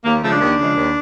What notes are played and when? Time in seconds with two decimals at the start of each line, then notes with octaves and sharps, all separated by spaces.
0.05 D#2 A#3
0.23 C#3 F3 G#3 A3
0.32 D4
0.40 D#2
0.59 C#3 F3 G#3
0.75 D#2